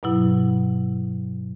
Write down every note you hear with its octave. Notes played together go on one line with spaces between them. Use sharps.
G2 B2 F#3 E4